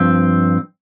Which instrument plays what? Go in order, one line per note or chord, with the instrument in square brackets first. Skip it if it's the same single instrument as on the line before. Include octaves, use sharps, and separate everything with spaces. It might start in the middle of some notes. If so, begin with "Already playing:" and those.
Already playing: [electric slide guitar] G2 F3 C4